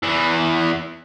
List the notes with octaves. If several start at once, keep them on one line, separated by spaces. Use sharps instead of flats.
E2 E3